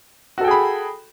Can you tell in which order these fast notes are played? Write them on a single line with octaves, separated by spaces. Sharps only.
F#4 A4 G5 G#4 B5